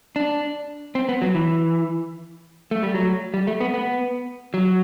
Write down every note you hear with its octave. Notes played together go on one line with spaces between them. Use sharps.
D4
C4
B3
F#3
E3
A3
G3
F#3
G3
A3
B3
B3
F#3